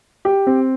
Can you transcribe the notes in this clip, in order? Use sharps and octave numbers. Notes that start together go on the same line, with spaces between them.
G4
C4